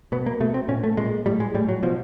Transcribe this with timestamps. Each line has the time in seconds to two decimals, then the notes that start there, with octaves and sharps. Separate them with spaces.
0.12 B2 B3
0.26 A#3
0.40 B2 A3
0.54 C4
0.68 A#2 C#4
0.84 A3
0.97 A#2 G#3
1.26 A2 G3
1.40 G#3
1.54 A2 G3
1.69 F#3
1.83 B2 F3